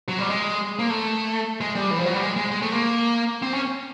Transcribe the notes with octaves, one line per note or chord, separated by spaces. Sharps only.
F#3
G3
G#3
A#3
A3
G#3
G3
E3
F3
F#3
G3
G#3
G#3
G#3
A3
A#3
C4
C#4